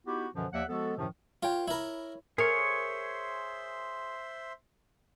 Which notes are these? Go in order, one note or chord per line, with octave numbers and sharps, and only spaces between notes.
B3 D#4 E4 F#4 G4
F#2 B2 D3 E3 F3
D#2 F3 A#3 D5 E5 F#5
F3 G#3 B3 F#4 A4
F#2 A2 C3 D#3 F3
F4 A#4 C#5 G5
E4 A#4 C#5 B5
G#4 A#4 C5 C#5 E5 G#5 C6